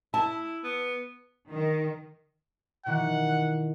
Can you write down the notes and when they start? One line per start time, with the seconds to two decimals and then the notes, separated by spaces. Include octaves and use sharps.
0.14 E4 A5
0.64 B3
1.50 D#3
2.86 B2 D#3 E3 F#5